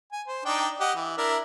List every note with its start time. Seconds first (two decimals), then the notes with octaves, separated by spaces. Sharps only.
0.12 G#5
0.28 C5
0.45 D4 D#4 G5
0.80 G4 D#5 F#5
0.96 E3
1.18 D4 E4 A#4